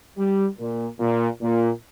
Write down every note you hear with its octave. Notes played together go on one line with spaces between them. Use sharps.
G3
A#2
A#2
A#2